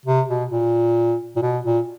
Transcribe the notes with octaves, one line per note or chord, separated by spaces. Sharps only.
C3
B2
A#2
A#2
B2
A#2